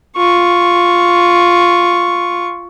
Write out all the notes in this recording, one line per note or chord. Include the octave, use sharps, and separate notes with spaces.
F4 C#6